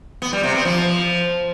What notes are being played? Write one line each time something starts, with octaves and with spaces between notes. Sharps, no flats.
B3
G3
C3
B3
F3